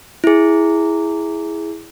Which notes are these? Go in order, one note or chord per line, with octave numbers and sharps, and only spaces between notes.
E4 G#4